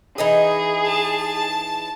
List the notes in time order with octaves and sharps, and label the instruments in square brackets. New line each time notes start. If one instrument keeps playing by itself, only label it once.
[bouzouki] E3 D#4 D#5 [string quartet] G#4
[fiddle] A5